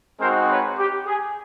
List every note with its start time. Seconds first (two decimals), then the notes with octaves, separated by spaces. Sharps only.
0.20 G#3 C4 D#4 F#4 A#4 C5
0.49 B4 C#5
0.78 G4
1.06 G#4